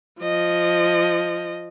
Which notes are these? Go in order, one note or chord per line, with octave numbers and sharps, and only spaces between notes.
F3 D#5